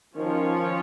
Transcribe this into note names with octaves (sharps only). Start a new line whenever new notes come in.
D#3 F3 C#4 F4 C#5